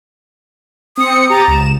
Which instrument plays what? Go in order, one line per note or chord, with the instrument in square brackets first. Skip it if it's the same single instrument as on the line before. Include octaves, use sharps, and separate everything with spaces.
[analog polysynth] C4 C#7 [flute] D#6
[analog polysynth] G4 D#6 A6 [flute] A#5
[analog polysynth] C#2 E7